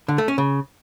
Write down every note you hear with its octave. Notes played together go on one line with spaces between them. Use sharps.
D3
A3
C#4
C#3